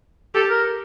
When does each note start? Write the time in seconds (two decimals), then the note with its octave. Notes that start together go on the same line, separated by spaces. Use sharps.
0.35 G4 A4
0.50 A#4